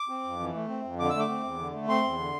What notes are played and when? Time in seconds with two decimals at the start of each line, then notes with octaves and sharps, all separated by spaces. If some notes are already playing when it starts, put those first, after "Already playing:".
Already playing: D6
0.09 C4
0.24 F2
0.40 E3
0.54 A3
0.68 C4
0.84 F2
0.99 D3 D6
1.10 A3 E6
1.20 D6
1.29 C4
1.43 E2
1.58 D3
1.73 A3
1.88 C4 C6
2.04 E2
2.18 D3